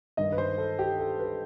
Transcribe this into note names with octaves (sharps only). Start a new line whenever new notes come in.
G2 D#3 D#5
B4
C5
A4
G4
A4
B4